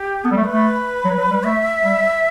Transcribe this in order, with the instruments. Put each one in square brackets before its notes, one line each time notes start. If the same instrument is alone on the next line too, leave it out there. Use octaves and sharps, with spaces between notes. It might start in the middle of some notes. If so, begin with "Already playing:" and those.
Already playing: [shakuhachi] G4
[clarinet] B3 [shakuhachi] A4
[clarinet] G3
A3
[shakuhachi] B4
[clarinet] A3
F#3
F#3
G3
[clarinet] A3 [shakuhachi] E5
[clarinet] G3